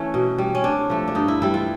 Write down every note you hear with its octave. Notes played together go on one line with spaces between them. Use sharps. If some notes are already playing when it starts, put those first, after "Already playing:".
Already playing: E3 A3 C#4
B2
G3
C#4
C3 D4
F3 A3
D4
G2 D#4
E4
E3 G3 E4
F4